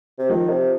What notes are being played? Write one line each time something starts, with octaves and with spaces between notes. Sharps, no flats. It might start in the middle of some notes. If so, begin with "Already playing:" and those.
C3
D#3 F3
C3